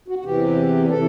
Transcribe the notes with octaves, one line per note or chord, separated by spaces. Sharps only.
F#4
F#4
E2 C3 E3 G4
C3 E3 A4